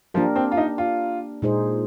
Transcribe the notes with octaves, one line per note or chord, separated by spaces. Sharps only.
F3 A#3 D4 G4 A#4
C4
F4
D#4
F4
A#2 G#3 D#4 G#4 C5